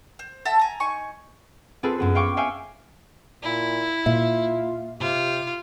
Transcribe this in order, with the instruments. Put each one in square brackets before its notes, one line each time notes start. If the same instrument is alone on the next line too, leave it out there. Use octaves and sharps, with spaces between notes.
[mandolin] C5
A4 E5 F#5 A5
G#5 A#5
D#4 G#5 C#6
[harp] C4 F4 G#4 A4 B4
F#2 B3 B4
F5 G5 C#6 D6
C#5 E5 F5 G5 G#5
[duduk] A#2 [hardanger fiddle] E4
[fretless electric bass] A#2 [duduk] F4 [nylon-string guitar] E5
[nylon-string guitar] C3 [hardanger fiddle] F4 [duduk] G4